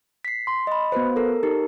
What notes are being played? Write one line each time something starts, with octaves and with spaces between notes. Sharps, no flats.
B6 C7
C6
D#5 B5
B3 F#4 B4 C5
A4 A#4
D#4 G4 A#4